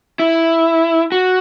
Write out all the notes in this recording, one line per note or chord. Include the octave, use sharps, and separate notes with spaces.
E4
F#4